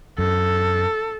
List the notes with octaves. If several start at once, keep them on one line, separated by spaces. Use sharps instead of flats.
F#2 A4